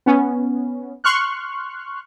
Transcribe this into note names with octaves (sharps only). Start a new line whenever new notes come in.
B3 C#4
C6 C#6 F6 F#6